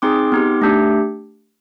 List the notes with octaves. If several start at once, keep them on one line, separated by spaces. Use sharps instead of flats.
C4 D#4 G#4 C6 D6
B3 D#4 G4
A3 D4 G4